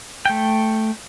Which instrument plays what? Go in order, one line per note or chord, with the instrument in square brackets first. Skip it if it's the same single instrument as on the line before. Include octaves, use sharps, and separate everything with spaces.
[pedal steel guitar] A3 G5